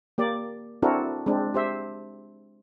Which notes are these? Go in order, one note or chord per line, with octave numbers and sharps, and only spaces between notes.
A#3 G4 D5
C4 D4 E4 F#4 A4 A#4
G#3 C4 D4
G4 C5 E5